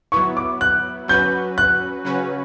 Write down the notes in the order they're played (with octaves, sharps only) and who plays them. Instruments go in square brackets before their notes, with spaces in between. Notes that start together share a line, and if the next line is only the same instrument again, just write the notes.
[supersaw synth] F#3 B3 E4 [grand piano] C#6
[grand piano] D6
F#6
[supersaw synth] F#3 C#4 F#4 B4 [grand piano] G6
[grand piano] F#6
[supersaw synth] C#3 F#3 C#4 F#4 B4